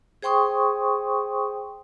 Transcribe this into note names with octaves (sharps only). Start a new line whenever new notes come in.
G#4 C5 G5 C6 C#6 D#6